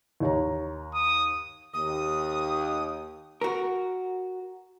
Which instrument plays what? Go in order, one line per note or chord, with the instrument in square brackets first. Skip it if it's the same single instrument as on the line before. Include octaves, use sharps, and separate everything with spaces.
[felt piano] D#2 C#5 A#5
[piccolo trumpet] D#6
[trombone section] D#2 [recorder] D#6
[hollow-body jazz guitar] F#4 A#4